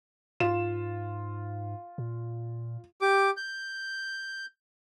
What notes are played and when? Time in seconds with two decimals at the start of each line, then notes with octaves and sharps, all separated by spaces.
0.40 G#2 F4 E7
1.98 A#2
3.01 G4 D6
3.37 G6